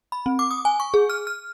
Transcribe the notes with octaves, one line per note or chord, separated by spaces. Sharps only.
B5
C4
D6
D#6
G#5
C#6
G#4
F6
F6